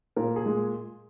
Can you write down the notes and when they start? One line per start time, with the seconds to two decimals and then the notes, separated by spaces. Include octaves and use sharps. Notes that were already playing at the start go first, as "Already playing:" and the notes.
0.16 A#2 A#4
0.36 G#4
0.46 G#3